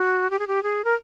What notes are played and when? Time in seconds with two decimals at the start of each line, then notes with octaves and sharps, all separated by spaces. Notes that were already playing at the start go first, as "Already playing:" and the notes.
Already playing: F#4
0.30 G4
0.39 G#4
0.47 G4
0.63 G#4
0.84 A#4